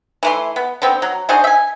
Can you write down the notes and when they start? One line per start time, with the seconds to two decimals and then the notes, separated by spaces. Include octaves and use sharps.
0.23 E3 A3 C6
0.56 B3
0.82 D3 B3 C4
1.02 F#3
1.29 D4 F#4 G#4 C5
1.44 E5 G#5